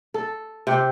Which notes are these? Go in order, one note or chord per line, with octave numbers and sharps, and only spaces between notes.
A4
C3 G4